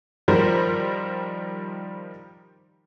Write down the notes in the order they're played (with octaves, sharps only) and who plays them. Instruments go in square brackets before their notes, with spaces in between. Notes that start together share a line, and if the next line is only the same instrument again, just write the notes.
[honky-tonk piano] D#3 F3 G3 A#4 C5